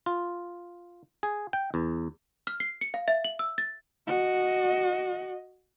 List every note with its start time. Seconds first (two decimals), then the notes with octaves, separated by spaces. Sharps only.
0.06 F4
1.23 G#4
1.53 G5
1.74 E2
2.47 F6
2.60 C7
2.81 C#7
2.94 F5
3.08 E5
3.25 F#7
3.39 E6
3.58 A6
4.07 F#4 D#5